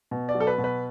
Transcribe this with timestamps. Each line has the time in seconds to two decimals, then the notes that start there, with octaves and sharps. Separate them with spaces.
0.11 B2
0.29 D5
0.35 F#3
0.40 A4
0.47 B4
0.58 B2
0.64 B4